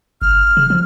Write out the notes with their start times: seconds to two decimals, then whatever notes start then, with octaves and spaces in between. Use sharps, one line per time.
0.22 G1 F6
0.57 C#3
0.70 F3